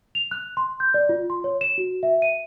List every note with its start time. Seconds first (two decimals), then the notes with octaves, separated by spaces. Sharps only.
0.15 F7
0.31 F#6
0.57 C6
0.80 G6
0.94 D5
1.09 F4
1.30 C6
1.44 C#5
1.61 E7
1.78 F#4
2.03 E5
2.22 D#7